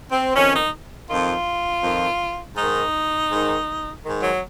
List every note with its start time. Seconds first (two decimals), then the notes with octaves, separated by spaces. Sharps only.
0.10 C4
0.34 F2 D#3 C#4
0.53 D#4
1.08 F2 D#3 F4
1.83 F2 D#3
2.57 G#2 D#3 D#4
3.31 G#2 D#3
4.05 G#2 D#3
4.23 F#3